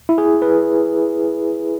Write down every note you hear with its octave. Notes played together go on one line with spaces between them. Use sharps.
E4
G#4
B4